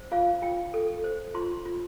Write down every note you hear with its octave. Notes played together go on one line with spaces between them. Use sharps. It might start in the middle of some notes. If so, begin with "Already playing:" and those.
Already playing: C5
F4 F5
F4 G5
A4
C5
F4 C6
F4